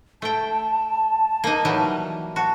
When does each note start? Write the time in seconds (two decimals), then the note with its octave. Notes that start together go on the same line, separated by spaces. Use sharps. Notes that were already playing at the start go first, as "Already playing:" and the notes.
0.22 A3 G5 A5
1.44 A#3 D#4
1.65 E3 F#3 G3
2.36 F#4 A5